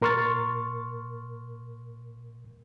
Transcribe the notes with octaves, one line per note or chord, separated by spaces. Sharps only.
A#2 A#4 C6 C#6 F6 A6